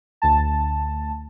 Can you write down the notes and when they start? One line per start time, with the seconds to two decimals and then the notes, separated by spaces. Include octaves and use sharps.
0.22 D2 A5